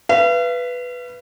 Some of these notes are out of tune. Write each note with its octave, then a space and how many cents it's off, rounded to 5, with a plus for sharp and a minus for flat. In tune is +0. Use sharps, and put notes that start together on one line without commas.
B4 +0 F5 -45